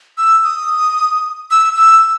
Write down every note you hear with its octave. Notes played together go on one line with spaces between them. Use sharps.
E6
D#6
E6
E6